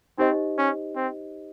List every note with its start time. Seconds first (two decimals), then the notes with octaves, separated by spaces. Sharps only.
0.18 C4 D#4 G4 C5 D#5
0.58 C#4
0.96 C4